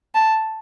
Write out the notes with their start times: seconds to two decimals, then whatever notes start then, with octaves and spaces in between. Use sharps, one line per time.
0.15 A5